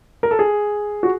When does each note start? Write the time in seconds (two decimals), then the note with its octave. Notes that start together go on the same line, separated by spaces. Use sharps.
0.23 A#4
0.31 A4
0.39 G#4
1.03 F#4